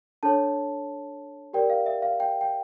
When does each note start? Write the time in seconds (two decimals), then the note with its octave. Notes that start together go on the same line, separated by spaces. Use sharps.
0.23 D4 A4 C#5 A5
1.53 G4 A#4 D5 G5
1.70 F5
1.86 E5
2.02 F5
2.20 G5
2.41 G5